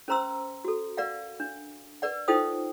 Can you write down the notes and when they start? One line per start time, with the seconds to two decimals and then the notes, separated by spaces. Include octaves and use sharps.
0.08 C#4 A#4 C5 A#5 C6 E6
0.65 F#4 A4
0.97 A#4 D5 F5 F#5
1.40 D4
2.02 A#4 B4 D5 F#5
2.28 D#4 F4 A4 C5 G5 D#6